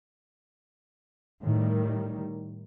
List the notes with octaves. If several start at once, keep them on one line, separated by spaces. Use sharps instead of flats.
A2 D#3 G3